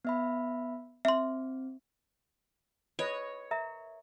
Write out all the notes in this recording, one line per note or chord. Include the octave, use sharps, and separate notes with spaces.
B3 E5 B5
C4 E5 C6
B4 C#5 D#5
A#4 E5 A#5